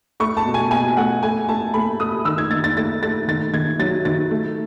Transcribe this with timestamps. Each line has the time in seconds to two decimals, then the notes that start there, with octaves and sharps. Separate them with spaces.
0.20 A3 C#6
0.37 A5
0.46 B2
0.54 G#5
0.71 B2 G#5
0.97 A3 F#5
1.23 A3 G#5
1.49 A3 A5
1.74 A3 B5
2.00 A3 D#6
2.25 D#3 E6
2.38 G#6
2.51 D#3 A6
2.64 A6
2.77 A3 A6
3.03 A3 A6
3.28 D#3 A6
3.53 D#3 G#6
3.79 F#3 A6
4.05 D#3 A6
4.31 A3